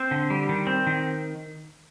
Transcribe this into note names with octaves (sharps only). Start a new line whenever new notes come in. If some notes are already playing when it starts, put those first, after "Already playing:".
Already playing: C4 C5
D3
G3
D#3
C4
D#3